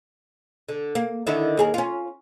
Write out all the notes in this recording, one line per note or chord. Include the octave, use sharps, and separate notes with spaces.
D3
A#3
D3 D#3 E4
D#2 G#4 A#4
C#4 F4